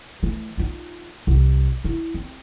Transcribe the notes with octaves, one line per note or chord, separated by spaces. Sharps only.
E3 A3
D#4 F4
C2
E4
C4